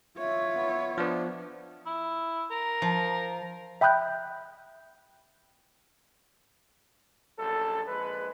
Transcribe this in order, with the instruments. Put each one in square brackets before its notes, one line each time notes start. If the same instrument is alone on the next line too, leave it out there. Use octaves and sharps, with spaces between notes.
[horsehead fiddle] F4 C#5 [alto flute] E5
[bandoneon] B3
[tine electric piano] F3 B3 [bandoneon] D4
[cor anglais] E4
A#4
[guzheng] F3
[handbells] E5 G5 B5 D#6 F#6 G6
[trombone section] A#1 F#2 A4
A#1 G#3 B4